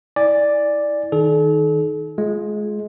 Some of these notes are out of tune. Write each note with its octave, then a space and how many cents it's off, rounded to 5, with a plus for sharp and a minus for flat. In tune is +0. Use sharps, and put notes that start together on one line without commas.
E4 -20 D5 +0 G#5 -15
D#3 +15 D#4 +0 A4 -40
G#3 +20 F4 +0